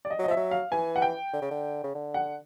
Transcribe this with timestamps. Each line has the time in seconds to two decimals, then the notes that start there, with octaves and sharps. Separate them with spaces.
0.05 D5
0.11 D#5
0.19 F#3
0.24 D#5
0.28 F3 E5
0.36 F#3
0.51 F5
0.71 E3 G#5
0.96 F#5
1.02 G5
1.33 D3
1.42 C#3
1.51 D3
1.84 C#3
1.95 D3
2.14 F#5